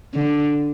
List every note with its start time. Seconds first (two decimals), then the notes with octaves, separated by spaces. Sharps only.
0.14 D3